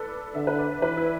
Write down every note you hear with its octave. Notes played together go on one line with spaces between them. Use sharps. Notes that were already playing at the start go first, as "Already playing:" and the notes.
Already playing: A4 B4 D5
D3 E5
B4
D5
E3 B4
E4